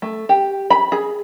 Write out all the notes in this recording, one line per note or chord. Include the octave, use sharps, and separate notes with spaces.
A3
G4
B5
G#4